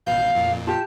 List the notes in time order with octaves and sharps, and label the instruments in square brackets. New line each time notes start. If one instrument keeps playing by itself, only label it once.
[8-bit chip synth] A1 B2 G6 [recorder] F5
[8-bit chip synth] F2 A#2
[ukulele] F4 G4 [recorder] A5